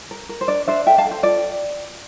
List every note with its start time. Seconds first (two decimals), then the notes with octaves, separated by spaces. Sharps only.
0.11 A#4
0.29 A#4
0.41 C5
0.48 D4 D5
0.68 D4 C5 E5
0.86 A4 E5 G5
0.98 F5 A5
1.05 A4
1.11 C5
1.23 F4 D5